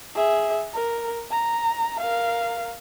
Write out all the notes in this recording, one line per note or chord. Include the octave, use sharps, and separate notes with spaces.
G#4 E5
A#4
A#5
A#4 F5